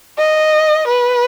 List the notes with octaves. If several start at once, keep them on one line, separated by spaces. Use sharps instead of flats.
D#5
B4